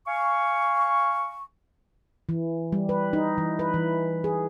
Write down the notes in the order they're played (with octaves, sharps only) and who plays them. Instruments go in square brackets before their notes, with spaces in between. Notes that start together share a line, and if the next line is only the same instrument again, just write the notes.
[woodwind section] F5 G#5 C#6
[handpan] E3
G3
B4
D#4
E3
B4
E3
G#4